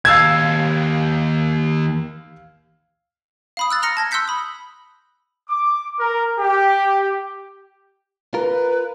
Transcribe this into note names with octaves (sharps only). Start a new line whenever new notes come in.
D#2 F5 A5 E6 G#6
F5 B5 D#6
E6 F#6 A6
A#5 C6 F6 A#6 C#7
A5 G#6 A#6
C6 E6 F#6 G6 B6 C#7
B5 D#6
D6
A#4
G4
F4 A#4 B4